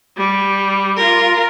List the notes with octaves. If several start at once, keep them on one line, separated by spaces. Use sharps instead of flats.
G3
F4 A#4